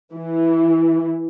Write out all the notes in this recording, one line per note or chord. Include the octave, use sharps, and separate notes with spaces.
E3